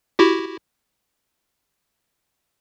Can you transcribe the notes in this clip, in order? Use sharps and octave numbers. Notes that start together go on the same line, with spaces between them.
E4 F#4 G4